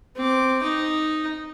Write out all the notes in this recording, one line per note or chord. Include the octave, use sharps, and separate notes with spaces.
C4 D6
D#4